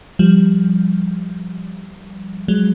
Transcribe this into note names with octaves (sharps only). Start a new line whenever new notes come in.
F3 G3
F#3 G#3